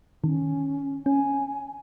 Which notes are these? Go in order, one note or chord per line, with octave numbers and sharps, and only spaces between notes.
D#3 C#4
C#4 G#5